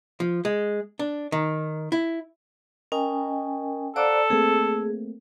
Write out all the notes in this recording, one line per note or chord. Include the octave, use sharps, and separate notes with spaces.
F3
G#3
D4
D#3
E4
C#4 A#4 D#5 G5 G#5
A4 C5 D5 F5 F#5 A#5 D6
A3 A#3 C4 G#4